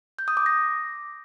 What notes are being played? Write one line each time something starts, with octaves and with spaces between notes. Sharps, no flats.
G6
D#6
D6
A#6